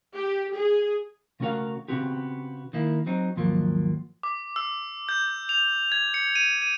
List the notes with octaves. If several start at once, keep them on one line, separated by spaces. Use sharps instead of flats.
G4
G#4
C#3 A3 C#4 F#4 A#4 F5
C#3 F3 B3 C4 F#4 G4
D#3 A#3 E4
F#3 C4 D#4
D#2 G#2 F3 F#3 A#3
D6
E6
G6
F7
G#6
C#7
D#7
D#7